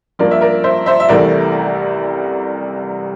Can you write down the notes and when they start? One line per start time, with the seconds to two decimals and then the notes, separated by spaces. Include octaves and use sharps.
0.19 G2 F3 A#3 A#4 D5
0.31 E5
0.41 A#4 D5
0.64 C5 E5
0.86 C5 E5
1.00 E5
1.09 C2 C3 E3 A3 A#4 D5